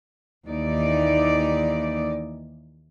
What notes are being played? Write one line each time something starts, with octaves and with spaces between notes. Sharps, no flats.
D#2 E3 D#4 D5